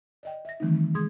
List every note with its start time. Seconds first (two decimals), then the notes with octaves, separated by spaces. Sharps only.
0.23 D5 D#5 G5
0.45 E5 A#6
0.60 D#3 E3 G3 A3 C4 D#4
0.94 C3 G#3 G#4 C6 D#6 G#6